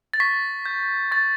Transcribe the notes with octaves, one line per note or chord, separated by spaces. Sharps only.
A6
C#6 B6
G6
C#6 A6